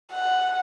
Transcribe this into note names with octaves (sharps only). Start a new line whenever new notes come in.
F#5